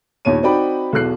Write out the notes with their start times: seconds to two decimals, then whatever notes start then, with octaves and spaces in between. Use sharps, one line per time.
0.25 D#2 A#2 C#5 D#7
0.43 C4 D#4 F#4 D5 G5 B5
0.93 B1 E2 B2 F#6 C7